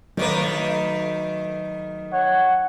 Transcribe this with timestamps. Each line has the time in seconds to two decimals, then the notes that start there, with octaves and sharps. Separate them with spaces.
0.17 D#3 F#3 A3 B4
2.11 C#5 F#5